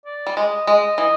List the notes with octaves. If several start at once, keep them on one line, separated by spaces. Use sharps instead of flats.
D5
G3
G#3 D#5
G#3 D#5
E3 D#5